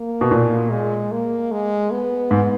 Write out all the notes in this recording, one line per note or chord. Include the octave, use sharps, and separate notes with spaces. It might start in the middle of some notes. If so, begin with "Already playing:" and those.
Already playing: A#3
B2
A#2
G#3
A#3
G#3
B3
G#2